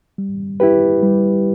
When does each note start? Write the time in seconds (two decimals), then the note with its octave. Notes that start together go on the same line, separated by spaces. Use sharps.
0.18 G3
0.60 E4 G4 B4
1.03 G3